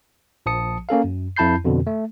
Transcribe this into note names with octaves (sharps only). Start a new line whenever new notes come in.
A#1 F3 A5 D#6 C#7
A#3 C#4 A4 F5
F#2
F2 E4 A5 B5 G6 C7
F2 B2 D3
A3